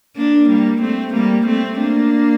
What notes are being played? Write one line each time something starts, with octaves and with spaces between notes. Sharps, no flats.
A#3 D4
G3 A#3
A3 C4
G3 A#3
A3 C4
A#3 D4